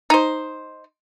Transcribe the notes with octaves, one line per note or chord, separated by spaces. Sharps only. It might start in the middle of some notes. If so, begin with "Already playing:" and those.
D#4 C5